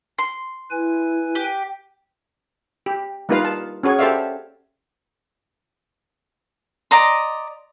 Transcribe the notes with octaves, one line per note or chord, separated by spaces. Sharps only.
C6
E4 B4 G#5
G4
G4
G3 A#3 D#4 F4 B4 F5
A5
C#4 F#4 G#4 C#5
G4 A4 C5 D5 E5 F5
D5 D#5 A#5 C6